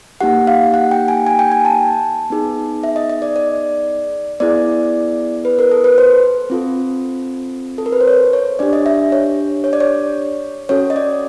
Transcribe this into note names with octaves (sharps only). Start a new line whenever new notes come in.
A#3 D#4 G4 F#5
F5
F#5
G5
G#5
G#5
G5
G#5
A5
B3 D#4 G#4
E5
D#5
D#5
D5
D5
B3 E4 G#4 D5
B4
A#4
A4
B4
C5
C4 F4 A4
A4
A#4
B4
C5
C#5
C#5
D4 G4 D5
D#5
E5
C#5
C#5
D5
C#5
C#4 F#4 A4 C#5
D#5
D5